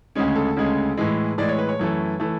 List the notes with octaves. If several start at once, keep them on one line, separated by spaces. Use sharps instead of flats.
D2 C#3 G#3 C#4
A4
D2 C#3 G#3 C#4
A2 E3 G#3
A2 E3 G#3 D5
C#5
B4
C#5
F#2 E3 A3
E3 A3